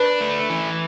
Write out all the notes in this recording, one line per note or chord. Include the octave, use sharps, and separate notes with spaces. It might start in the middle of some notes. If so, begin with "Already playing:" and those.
Already playing: D4 B4
A3
E3